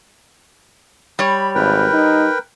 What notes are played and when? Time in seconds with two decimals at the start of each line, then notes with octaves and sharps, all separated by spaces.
1.19 G3 C#5 B5
1.55 G#1 A#4 B4 G5
1.93 D#4